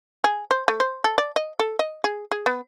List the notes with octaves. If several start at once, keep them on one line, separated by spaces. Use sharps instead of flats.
G#4
C5
A3
C5
A4
D5
D#5
A4
D#5
G#4
G#4
B3